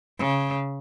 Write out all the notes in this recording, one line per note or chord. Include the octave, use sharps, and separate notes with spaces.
C#3